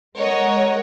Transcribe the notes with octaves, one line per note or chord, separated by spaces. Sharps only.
G#3 A#4 C#5 D#5 F#5